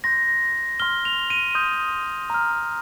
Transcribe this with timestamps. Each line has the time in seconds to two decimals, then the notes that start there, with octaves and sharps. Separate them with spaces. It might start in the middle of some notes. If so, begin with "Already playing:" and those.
0.04 C6 G6 A#6
0.80 C6 F6 G7
1.05 F7
1.30 D#7
1.55 C6 D#6 G6
2.30 A#5 F6